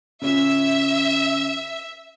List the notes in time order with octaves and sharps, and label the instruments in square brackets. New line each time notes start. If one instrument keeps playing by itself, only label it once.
[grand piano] C#3 C#4 F4 [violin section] E5